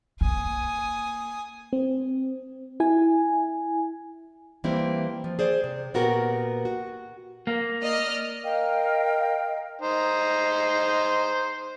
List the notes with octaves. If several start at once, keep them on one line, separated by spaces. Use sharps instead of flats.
A#3 G#5 D#6
C4
E4 G#5
E3 G3 A#3 C4 E4
F3
G#4 C5 D5
C3
A#2 B3 F#4 G4 A#4
F#4
A#3
D5 D#5 F6
A#4 D#5 F5 G5
D#4 C5